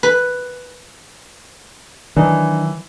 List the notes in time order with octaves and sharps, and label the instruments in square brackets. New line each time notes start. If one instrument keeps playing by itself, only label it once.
[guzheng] B4
[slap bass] D#3 F#3 [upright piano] E3 [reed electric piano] D4 D#4